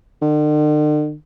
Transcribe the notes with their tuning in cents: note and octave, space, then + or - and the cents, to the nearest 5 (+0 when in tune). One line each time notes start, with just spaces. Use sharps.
D3 +45